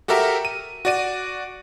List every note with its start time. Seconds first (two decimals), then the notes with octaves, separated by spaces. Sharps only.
0.08 F#4 G4 A4 A#4 E5 A#5
0.45 D#7
0.85 F#4 D5 D#7